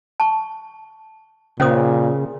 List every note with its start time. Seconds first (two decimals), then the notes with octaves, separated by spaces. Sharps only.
0.20 A5 C#6
1.60 A#2 C#3 C#4 C5 D#6